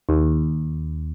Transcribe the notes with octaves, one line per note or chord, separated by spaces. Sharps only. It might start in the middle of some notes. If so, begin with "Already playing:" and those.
D#2